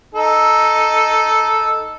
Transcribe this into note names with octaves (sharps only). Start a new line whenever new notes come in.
D#4 A4